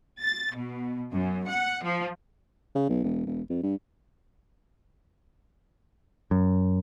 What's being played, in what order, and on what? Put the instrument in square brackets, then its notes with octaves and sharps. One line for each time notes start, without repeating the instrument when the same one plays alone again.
[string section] A6
B2
F#2
F#5
F3
[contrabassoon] C#3
B1
E1
E1
F2
G2
[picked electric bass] F#2